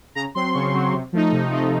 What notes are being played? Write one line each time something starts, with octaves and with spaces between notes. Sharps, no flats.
C#3 A#5
F#3 C4 C6
C#3 C#6
F#3 C4
C3
F3 A3 D#4
C3
F3 A3 D#4